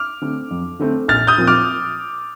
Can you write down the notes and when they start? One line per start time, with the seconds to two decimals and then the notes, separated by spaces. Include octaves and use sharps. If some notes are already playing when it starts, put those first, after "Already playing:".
Already playing: D6 F6
0.22 D3 A3 C4
0.51 F2
0.79 D3 A3 C4
1.08 A#1 F6 A6
1.27 D#6 G6
1.38 A#2 F3 C4
1.47 D6 F6